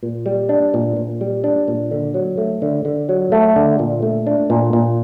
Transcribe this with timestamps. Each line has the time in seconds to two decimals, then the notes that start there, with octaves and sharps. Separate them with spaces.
0.03 A#2
0.26 G3
0.49 D4
0.74 A#2
0.97 A#2
1.21 G3
1.44 D4
1.68 A#2
1.91 D3
2.14 F#3
2.38 A3
2.62 D3
2.85 D3
3.09 F#3
3.32 A3
3.56 D3
3.79 A#2
4.02 A3
4.27 D4
4.50 A#2
4.73 A#2